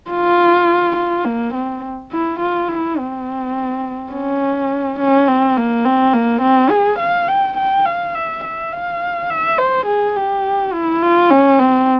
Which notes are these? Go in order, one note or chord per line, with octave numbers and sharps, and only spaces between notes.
F4
F4
A#3
C4
E4
F4
E4
C4
C#4
C#4
C4
A#3
C4
A#3
C4
G#4
F5
G5
G5
F5
E5
E5
F5
E5
C5
G#4
G4
E4
F4
C#4
C4